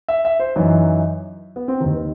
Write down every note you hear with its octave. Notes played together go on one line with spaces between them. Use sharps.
E5
E5
C5
F#2 E3 D#4
B3
C4
D#2 D#3 D#4
B4